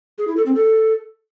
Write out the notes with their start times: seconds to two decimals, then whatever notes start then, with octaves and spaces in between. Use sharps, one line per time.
0.18 G#4
0.27 E4
0.37 A4
0.46 C4
0.55 A4